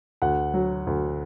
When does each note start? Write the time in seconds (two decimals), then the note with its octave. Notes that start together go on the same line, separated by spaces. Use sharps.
0.22 D2 F#5
0.54 F#3
0.87 D2